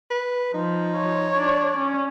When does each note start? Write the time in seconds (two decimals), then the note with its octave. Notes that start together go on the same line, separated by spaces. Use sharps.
0.10 B4
0.54 F3 D#4
0.96 C#5
1.35 D4 D5
1.77 C#4